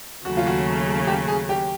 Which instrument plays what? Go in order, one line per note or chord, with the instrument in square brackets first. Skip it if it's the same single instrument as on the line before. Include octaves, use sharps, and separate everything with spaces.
[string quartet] D#2 C#3 F#3 A3 [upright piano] F#4
[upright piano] F4
F#4
G4
G#4
G4